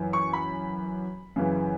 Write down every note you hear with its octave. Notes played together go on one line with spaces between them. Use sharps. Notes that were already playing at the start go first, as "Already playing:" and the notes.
Already playing: F#2 E3
C#6
B5
F#2 C#3 E3